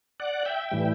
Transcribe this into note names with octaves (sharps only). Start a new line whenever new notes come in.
D5 F#5
E5 G5
A2 E3 G3